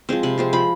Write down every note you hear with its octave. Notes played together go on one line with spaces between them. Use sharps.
F3 G#3 C4
C3 B5
F3 G#3 C4
F3 B5